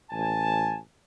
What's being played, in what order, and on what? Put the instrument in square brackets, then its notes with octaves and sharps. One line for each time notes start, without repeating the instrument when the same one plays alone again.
[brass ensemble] A1 G#5 A5